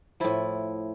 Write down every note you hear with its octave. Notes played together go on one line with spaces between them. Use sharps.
A2 F3 E4